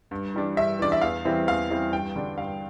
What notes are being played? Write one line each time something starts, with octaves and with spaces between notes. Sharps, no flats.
G2
E3 G3 D4
G2 E5
E3 G3 D4 D5
E5
E2 F5
E3 G3 C4 E4
E2 F5
E3 G3 C4 E4
G2 G5
D3 G3 D4
G2 F5